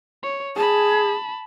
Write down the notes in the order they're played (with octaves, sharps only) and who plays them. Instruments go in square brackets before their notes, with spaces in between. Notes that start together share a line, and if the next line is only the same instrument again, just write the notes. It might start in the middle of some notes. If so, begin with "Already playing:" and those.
[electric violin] C#5
[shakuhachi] G#4 [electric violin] A5 B5